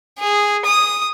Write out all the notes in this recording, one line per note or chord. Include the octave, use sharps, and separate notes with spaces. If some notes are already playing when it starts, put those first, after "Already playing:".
G#4
D#6